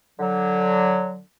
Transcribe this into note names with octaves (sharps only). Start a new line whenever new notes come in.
D3 F#3